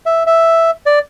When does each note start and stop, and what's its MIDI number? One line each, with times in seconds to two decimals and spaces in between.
0.06 0.23 76
0.26 0.71 76
0.86 0.99 74